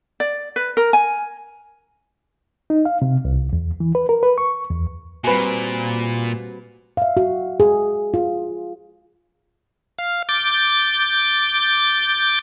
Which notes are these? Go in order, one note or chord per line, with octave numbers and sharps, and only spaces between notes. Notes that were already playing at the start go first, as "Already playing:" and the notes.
D5
B4
A#4
G#5
D#4
F5
C3
C2
E2
E3
B4
A#4
B4
C#6
E2
A#2 G3 C4 F#4 B4 G#5
E5 F5
F#4
G#4
F4
F5
D6 G6 A6